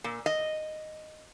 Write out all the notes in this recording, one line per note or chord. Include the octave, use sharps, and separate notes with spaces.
A#2
D#5